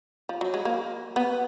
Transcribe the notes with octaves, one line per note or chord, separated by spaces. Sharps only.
F3
F#3
G#3
A#3
B3